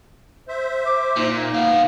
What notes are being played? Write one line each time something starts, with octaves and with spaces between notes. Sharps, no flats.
C5 E5
D6
A#2 D#4
D#4
B2 B3 F5